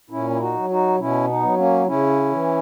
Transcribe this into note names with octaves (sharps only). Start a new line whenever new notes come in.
A#2 C#4 E4
E4
D#4 F#4
F#3
D#4 F#4
B2 C#4 E4
B3 D#4
F#3
A#3 C#4
C#3 C#4 E4
E3